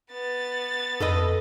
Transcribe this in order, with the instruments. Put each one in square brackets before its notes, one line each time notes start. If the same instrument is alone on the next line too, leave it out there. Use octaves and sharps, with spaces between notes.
[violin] B3 A6
[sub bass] F2 [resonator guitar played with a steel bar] A4 B4 D#5